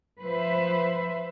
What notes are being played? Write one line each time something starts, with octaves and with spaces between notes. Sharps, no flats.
F3 B4 C5 E5